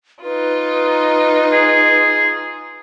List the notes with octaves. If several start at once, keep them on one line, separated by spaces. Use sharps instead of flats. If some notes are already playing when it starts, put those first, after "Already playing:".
D#4 F4 B4
G#4